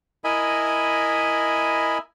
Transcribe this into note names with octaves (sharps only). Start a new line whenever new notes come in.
E4 A#4 D#5 E5 G#5 B5